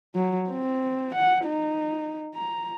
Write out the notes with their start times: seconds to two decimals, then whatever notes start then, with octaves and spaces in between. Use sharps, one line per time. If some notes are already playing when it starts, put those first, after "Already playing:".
0.15 F#3
0.50 C4
1.15 F#5
1.45 D#4
2.35 A#5